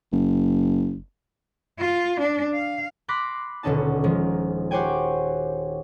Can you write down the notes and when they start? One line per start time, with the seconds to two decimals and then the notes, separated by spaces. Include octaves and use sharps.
0.12 F#1
1.79 F4
2.21 D4
2.54 F5
3.08 B5 C6 D6 F#6 A#6 B6
3.63 D#1 B2 D3 C#4 D#4 A5
4.04 D#3 F3 G#3
4.71 F#4 G4 C5 C#5 G5 G#5